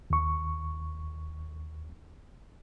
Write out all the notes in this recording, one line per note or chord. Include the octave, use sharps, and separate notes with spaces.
D#2 C#6